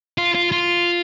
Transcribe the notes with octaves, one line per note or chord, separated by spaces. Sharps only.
F4
F4
F4